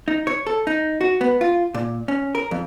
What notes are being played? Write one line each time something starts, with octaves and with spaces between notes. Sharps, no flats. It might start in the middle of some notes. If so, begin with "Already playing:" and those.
D#4
C#5
A4
D#4
F#4
B3
F4
A#2
C#4
A#4
F2